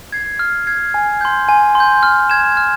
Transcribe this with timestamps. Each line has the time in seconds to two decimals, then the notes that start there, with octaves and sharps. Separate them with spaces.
0.12 G#6 C7
0.39 F6
0.67 G#6 C7
0.94 G#5
1.21 C6 G6
1.49 G#5
1.75 C6
1.80 G6
2.03 F6
2.30 G#6 E7
2.57 F6